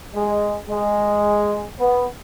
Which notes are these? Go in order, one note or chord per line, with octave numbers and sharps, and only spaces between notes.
G#3
G#3
B3